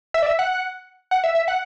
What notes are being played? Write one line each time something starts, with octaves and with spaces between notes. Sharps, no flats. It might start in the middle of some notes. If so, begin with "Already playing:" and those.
E5
D5
E5
F#5
F#5
E5
E5
F#5